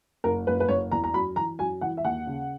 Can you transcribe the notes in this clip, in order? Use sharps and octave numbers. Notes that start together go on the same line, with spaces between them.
F#1 A#4
F#1 B4
B4
F#1 C#5
E2 A#5
A#5
F#2 B5
E3 A#5
F#2 G#5
E3 F#5
E5
D#2 F#5
C#3